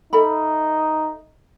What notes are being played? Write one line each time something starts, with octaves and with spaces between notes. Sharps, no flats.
D#4 A4 E5 B5